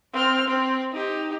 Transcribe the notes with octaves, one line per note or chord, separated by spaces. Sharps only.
C4 F6
C4
D#4 G4